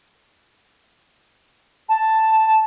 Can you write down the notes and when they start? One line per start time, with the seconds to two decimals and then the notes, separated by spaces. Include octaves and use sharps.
1.89 A5